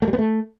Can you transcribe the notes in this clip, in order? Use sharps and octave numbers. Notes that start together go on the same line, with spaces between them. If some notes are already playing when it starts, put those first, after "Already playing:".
A3
G3
B3
A3